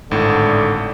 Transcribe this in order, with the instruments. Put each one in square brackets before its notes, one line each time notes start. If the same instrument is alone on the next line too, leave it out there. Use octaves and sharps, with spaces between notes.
[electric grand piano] G#1 A2 [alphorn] D3